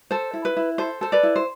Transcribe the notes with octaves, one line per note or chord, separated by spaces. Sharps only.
A4 C5
E4
B4
E4
A4 C5
A4 C5
B4 D5
E4
C5